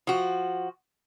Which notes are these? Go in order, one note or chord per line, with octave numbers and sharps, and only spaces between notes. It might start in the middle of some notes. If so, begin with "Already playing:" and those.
F3 F#4